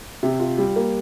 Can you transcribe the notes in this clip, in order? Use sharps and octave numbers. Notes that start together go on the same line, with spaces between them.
C3
F4
G3
A#3